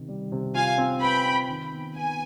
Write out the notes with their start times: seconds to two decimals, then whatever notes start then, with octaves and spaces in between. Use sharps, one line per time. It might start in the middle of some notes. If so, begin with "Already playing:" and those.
Already playing: C3 D#3
0.08 G3
0.32 C3
0.55 F4 F5 G#5
0.78 C4
1.01 B4 G5 B5
1.26 C4
1.49 D#3
1.72 B3
1.95 B3 G#5